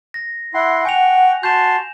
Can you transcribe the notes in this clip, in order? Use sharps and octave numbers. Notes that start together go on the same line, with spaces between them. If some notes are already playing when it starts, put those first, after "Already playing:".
A#6
E4 F#5 C6
G5 G#5 C#6 F7
F#4 A5 C6 G6 E7